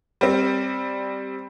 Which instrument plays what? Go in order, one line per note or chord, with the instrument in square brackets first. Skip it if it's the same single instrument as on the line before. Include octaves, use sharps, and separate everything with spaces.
[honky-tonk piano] G3 C4